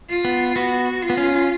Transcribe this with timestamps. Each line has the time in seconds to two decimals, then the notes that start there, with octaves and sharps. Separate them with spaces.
0.10 F4
0.25 B3
0.56 B3 F#4
1.02 F4
1.10 B3
1.17 C#4